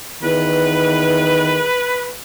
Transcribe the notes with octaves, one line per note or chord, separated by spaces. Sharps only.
E2 D#3 B4